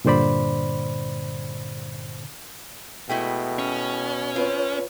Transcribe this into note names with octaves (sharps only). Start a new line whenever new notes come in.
G2 A#2 D3 C5 D5 B5
B2 G#3 A3 E4 G5
C#4
C4 F4 B4 C#5